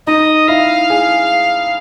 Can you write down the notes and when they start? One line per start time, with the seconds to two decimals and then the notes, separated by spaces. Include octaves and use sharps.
0.07 D#4 D#5
0.48 E4 F5
0.90 G#4